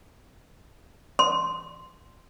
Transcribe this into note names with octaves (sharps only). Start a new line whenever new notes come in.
C6